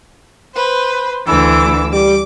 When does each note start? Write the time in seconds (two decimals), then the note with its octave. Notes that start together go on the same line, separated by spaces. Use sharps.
0.54 B4 C5
1.27 D2 E3 D6 E6
1.93 G3 D6